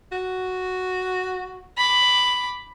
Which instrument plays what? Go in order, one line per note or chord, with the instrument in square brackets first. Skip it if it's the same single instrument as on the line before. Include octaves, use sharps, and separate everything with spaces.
[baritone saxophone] F#4
[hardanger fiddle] B5 D6